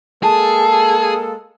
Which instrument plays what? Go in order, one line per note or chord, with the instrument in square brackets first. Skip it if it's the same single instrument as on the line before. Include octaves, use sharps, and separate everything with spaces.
[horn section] G#3 A#3 A4 [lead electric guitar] G#4 [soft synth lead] A5